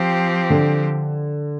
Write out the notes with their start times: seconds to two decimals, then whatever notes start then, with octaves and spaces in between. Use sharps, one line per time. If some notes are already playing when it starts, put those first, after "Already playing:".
Already playing: F3 C4 G4
0.50 D3